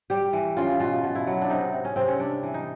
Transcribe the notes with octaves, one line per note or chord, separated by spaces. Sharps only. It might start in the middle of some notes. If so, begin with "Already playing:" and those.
G3 G4
E3
C#3 F4
B2 F4
B2
E4
F#3
D4
C3 D#4
C3
C#4
C3 C4
C#4
G3 D4
E3
D#4